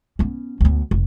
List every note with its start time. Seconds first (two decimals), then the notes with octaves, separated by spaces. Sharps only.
0.19 B3 C#4
0.61 D2 B3
0.91 F1